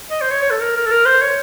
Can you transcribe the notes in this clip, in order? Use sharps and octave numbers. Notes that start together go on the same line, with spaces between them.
D#5
C5
C#5
C#5
A4
A#4
A#4
A4
A#4
C5
C#5